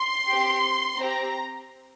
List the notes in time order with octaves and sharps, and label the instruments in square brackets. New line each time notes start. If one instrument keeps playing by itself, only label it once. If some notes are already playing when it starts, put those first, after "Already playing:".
Already playing: [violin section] C6
C4 G4
C4 G4 A#5